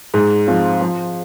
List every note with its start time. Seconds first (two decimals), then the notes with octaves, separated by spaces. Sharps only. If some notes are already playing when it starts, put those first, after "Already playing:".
0.14 G#2
0.47 F3 C4 F4
0.81 F3